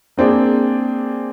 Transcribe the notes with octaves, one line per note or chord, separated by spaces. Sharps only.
A#3 C4 D4 G#4